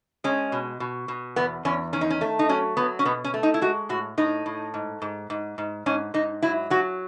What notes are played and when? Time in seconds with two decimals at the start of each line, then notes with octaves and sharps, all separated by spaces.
0.24 G#3 C#4
0.52 B2
0.80 B2
1.08 B2
1.36 E2 B3
1.65 E2 C#4
1.93 D#3 C#4
2.01 D#4
2.10 C#4
2.21 A3
2.39 D#4
2.49 F#3 C#4
2.77 F#3 B3
2.99 C#4
3.05 B2 B3
3.24 C#4
3.34 A3
3.43 D#4
3.54 E4
3.61 G#3 F#4
3.89 A2 F#4
4.18 A2 D#4
4.46 A2
4.74 G#2
5.02 G#2
5.30 G#2
5.58 G#2
5.86 G#2 C#4
6.14 G#2 D#4
6.42 F#3 E4
6.70 F#3 F#4